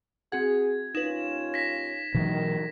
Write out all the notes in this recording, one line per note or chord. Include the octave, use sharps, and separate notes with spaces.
C4 F#4 G#4 F#5 G#6
D#2 C#4 D#4 F4 B4 E7
A#6 B6
B2 D#3 E3 F#3